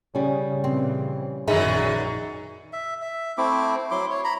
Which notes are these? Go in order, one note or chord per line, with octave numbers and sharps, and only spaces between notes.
C#3 G3 C#4
A#2 C#3 E3 C4
A#1 F#2 D3 D#3 F#3 D#4 G#4 E5
E5
E5
A3 C4 E4 D6
F#3 E4 C6 D6
C#5
A#5 B5